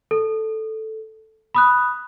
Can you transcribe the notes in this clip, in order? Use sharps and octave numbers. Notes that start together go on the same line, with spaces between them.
A4
B5 D#6 F#6